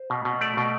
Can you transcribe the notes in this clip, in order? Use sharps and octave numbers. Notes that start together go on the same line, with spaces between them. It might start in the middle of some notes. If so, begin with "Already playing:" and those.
Already playing: C5
B2
B2
A3 D5
B2